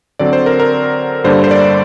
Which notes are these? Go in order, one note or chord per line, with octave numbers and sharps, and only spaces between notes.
D3 F#3 C4 D5
C5
A#4
A#4
G2 D3 G3 A#3 D4 C5
C5
D5